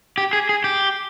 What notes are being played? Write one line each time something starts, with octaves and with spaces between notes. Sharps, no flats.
G4
G#4
G#4
G4